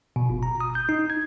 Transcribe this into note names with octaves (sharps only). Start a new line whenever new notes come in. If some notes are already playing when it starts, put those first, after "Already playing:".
B2
G1
A#5
D#6
G6
D#4
G#6